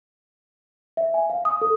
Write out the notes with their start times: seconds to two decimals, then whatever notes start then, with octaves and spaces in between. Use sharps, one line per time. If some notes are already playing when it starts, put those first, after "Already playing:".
0.97 E5
1.14 G#5
1.30 F5
1.45 D#6
1.62 A4